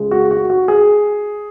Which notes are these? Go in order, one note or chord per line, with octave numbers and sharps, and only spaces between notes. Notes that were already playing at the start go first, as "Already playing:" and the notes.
Already playing: C#2 C#3 G#3
F#4
F#4
F#4
G#4